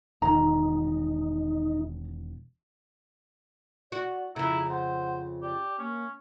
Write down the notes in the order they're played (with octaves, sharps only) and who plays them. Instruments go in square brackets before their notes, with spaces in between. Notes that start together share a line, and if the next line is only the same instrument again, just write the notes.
[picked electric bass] E1 D#3 [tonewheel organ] D#4 [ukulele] A#5
[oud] F#4 [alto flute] D5
[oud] F2 C#3 [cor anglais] E4 [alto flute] A#5
[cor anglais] C5 [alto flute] F#5
[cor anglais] G4 [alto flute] D5
[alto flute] A#3 [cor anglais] C#4